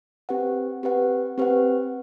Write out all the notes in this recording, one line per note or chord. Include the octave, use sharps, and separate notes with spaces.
C4 G4 B4 F#5
C4 G4 B4 F#5
C4 G4 B4 F#5